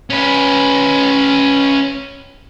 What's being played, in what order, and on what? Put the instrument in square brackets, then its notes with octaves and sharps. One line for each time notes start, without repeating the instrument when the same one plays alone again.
[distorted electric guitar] C#4 B4